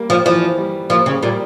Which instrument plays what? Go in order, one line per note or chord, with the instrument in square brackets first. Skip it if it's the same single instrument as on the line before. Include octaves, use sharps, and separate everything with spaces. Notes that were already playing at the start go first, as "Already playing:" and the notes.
Already playing: [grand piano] G3 A#3
[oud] F3
[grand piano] E3 [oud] F3
[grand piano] G3
[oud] F3 [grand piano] A#3
[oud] C#3
[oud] A#2 [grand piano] G3